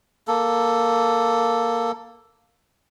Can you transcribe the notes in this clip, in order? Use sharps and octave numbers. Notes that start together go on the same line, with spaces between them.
A#3 A4